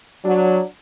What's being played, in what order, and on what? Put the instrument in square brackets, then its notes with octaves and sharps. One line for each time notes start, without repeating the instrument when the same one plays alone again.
[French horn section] F#3 [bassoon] D4